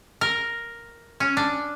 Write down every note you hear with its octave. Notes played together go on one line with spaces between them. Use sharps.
A#4
C#4
D4